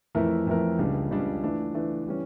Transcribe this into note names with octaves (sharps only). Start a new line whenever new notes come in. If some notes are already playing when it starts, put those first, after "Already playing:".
F2 E3 A3 E4 A#4
F2 E3 A3 E4 A#4
C#2 C#3 G3 D4
C#2 C#3 G3 D4
E3 A3 D4
E3 A3 D4
E3 G3 C#4